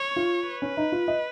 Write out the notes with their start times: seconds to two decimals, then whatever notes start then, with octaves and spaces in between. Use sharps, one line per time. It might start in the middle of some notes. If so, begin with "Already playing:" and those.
Already playing: C#5
0.16 F4
0.47 B4
0.62 C#4
0.77 D#4
0.92 F4
1.08 D#5